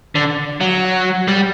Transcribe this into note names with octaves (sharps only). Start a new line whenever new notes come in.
D3
F#3
G3